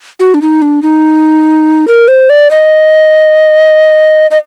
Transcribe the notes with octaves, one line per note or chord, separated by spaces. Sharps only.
F#4
D4
D#4
D4
D#4
A#4
C5
D5
D#5
D#5